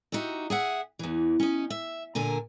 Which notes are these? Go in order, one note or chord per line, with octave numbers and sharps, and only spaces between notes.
D#4 F#4 G4 E5
G#4 E5 F#5
E2 E3
C#4 D#4
E5
A#2 D3 A#4 G#5